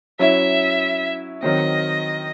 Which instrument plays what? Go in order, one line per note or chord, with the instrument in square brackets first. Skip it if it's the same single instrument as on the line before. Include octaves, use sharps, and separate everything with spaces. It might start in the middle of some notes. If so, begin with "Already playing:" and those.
[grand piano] F#3 C#4 E4 [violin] E5
[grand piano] D#3 F#3 C4 [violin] D#5